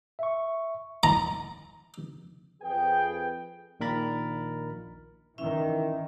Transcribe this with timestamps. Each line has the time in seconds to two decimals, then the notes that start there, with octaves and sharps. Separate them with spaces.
0.19 E5 C#6
1.03 A#5
2.62 F2 G#4 B4 G5
3.80 A#1 A#2 D#3 A#4 B5 A6
5.38 D#3 E3 C#4 E4 E5